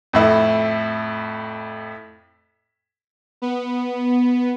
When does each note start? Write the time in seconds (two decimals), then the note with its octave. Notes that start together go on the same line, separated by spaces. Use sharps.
0.13 F2 A2 E4
3.42 B3